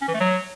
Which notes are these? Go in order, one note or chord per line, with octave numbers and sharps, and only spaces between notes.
C#4
E3
A3
F#3